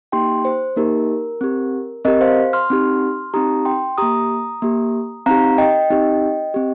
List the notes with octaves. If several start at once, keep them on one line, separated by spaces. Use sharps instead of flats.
A#3 D#4 G4 G5 C6
C5
A#3 D#4 G4 A#4
C4 G4
C4 G4 A#4 D#5
C5 F5
C6 F6
C4 D#4 G4
C4 D#4 G4 A#5 D#6
G5 C6
A#3 G4 A#5 D#6
A#3 G4
C4 D#4 G4 F5 A#5
D#5 G5
C4 D#4 G4
C4 G4